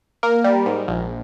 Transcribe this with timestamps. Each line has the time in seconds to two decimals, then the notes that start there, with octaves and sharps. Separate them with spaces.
0.23 A#3 A#4
0.44 G3
0.66 G#2
0.88 A#1